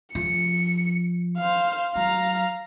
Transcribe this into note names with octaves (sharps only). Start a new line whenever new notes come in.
F3 C#7
C5 F5
F#3 F5 A#5